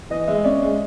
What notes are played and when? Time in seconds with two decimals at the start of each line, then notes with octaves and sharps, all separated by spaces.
0.10 E3 D#5
0.27 G#3 E5
0.44 C#4 D5
0.62 G#3